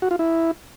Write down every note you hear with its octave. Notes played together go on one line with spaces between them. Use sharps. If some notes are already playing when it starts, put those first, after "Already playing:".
F#4
F4
E4